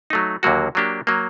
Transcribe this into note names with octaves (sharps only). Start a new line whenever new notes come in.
F#3 A3 D#4
D#2 D3 F#3 A#3 F#4
F#3 A#3 D4 G4
F#3 A#3